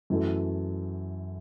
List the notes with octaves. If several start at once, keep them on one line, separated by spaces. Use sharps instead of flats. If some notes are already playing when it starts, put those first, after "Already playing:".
F#2 E3 A3